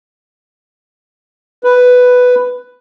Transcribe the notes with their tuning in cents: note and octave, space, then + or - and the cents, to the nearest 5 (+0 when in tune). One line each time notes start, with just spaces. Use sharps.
B4 +5